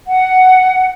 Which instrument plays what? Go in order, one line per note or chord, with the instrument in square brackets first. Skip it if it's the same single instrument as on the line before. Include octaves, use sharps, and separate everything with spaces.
[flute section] F#5